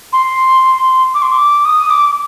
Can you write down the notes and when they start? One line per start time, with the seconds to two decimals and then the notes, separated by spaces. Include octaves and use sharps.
0.13 C6
1.14 D6
1.22 C6
1.32 D6
1.65 D#6
1.90 D6